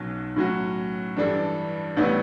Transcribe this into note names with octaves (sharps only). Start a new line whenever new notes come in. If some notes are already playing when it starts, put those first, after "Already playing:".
Already playing: B1 B2 F#3 C#4 F#4
A2 F#3 C#4 F#4
G2 E3 G3 D4 A4
A1 A2 G3 B3 E4